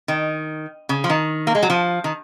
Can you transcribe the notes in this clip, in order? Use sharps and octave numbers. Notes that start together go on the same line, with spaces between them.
D#3
C#3
F3
D#3
A#3
G#3
F#3
F3
D#3